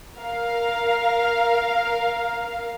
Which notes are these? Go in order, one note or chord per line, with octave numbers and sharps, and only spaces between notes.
A#4 F5